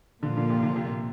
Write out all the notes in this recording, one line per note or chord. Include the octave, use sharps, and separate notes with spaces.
A#2 D3 F3 A#3 F4
D3
C3
D3
C3